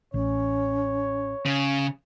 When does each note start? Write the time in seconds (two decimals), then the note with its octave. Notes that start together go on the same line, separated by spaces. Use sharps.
0.14 A1 C#4 C#5
1.46 C#3